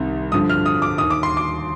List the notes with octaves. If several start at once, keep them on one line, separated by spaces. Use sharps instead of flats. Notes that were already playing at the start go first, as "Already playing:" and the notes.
Already playing: C2 C3 D#3
G2 D3 F3 D#6
F6
D#6
D6
D#2 D#3 D#6
D6
C6
D6